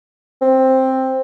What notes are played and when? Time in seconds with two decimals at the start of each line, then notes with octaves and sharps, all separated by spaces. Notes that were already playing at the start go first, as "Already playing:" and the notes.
0.42 C4